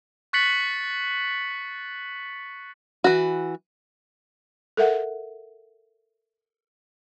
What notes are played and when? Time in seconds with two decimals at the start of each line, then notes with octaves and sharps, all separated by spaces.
0.33 C#6 F#6 A6 B6 C#7 F#7
3.04 E3 F#4
4.77 A4 A#4 E5 F#5